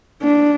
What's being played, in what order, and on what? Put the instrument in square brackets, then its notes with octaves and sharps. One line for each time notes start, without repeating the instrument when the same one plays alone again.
[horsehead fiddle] D4